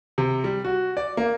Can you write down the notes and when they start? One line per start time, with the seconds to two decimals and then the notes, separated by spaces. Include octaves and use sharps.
0.18 C3
0.44 G3
0.65 F#4
0.97 D5
1.17 A#3